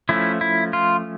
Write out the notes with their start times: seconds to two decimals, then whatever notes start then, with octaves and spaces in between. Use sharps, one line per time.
0.09 F3 A3 C#4 E4
0.41 E4
0.73 F4